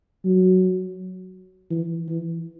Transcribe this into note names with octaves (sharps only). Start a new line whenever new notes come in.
F#3
E3
E3